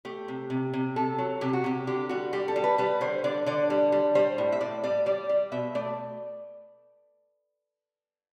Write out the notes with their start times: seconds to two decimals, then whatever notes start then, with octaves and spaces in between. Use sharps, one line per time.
0.05 A3 G4
0.28 C3
0.50 C3
0.73 C3
0.96 C3 A4
1.18 F#3
1.41 C3 G4
1.53 F#4
1.64 C3 G4
1.87 D3 G4
2.09 G3 F#4
2.33 G3 G4
2.48 A4
2.56 G3
2.64 B4
2.78 G3 B4
3.01 D3 C5
3.24 D3 D5
3.46 D3 D5
3.70 G3
3.92 G3
4.15 G3 C5
4.38 A2
4.52 E5
4.61 A2 D5
4.84 G3 D5
5.06 G3 D5
5.29 G3
5.52 B2 E5
5.75 A3 D5